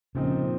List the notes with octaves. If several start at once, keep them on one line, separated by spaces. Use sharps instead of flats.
A#2 C#3 F3 C4 D#4